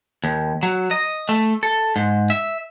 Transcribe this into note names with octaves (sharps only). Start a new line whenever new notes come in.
D#2
F#3
D#5
A3
A4
G#2
E5